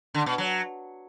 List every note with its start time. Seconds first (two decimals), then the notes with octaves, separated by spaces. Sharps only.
0.14 D3
0.26 B2
0.38 F#3